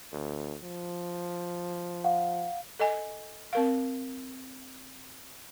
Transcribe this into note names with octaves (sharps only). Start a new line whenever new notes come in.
D2
F3
F5 F#5
A4 D#5 G#5
C4 A#4 F5